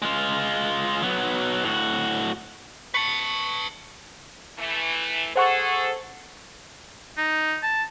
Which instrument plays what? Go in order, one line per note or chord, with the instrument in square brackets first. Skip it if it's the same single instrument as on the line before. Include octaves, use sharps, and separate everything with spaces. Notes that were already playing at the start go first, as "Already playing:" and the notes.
[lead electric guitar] G#3 F4
F#3 B3
A2 F#4
[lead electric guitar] B4 A5 [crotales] C#6 C#7 F#7
[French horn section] E3 A3
[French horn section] G#4 A4 [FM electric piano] C5 F#5 C#6
[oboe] D#4
A5